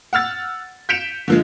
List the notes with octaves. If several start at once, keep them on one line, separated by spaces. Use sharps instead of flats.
F#5 E6 F6 A6
G6 B6 C#7 D7 E7 F7
D3 F3 G#3